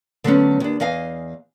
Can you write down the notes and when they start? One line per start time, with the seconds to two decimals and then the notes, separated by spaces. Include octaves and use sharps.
0.24 D3 F#3 A3 B3 C#4
0.60 D#2 D4
0.80 E2 D#5 F5 G#5